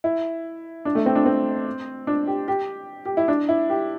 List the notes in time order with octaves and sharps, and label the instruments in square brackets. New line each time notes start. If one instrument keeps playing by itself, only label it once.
[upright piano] E4
D4
A3
C4
D4
C4
D4
G4
G4
G4
E4
D4
E4
G4